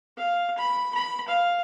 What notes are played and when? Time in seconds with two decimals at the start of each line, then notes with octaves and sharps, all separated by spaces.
0.17 F5
0.58 B5
0.95 B5
1.29 F5